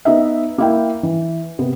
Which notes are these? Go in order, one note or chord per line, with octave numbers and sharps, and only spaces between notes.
B3 D#4 E5
A#3 E4 G5
E3
C3 B3